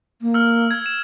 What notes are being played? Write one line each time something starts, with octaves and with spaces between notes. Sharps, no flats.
A#3
E6 F6
G#6
E7